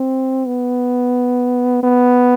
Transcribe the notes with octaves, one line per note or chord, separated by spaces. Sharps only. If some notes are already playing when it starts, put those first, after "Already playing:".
Already playing: C4
B3
B3